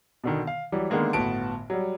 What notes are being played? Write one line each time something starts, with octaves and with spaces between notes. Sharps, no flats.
B2 D3 D#3
F5
E3 F#3 G3
D3 D#3 G#3 A#3 B3
G1 A2 B3 F#4 A5 D7
F#3 G3